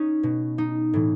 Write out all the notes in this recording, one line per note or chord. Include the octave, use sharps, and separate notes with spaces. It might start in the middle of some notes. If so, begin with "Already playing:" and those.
Already playing: C#4 D#4
B2
D#4
A2 E3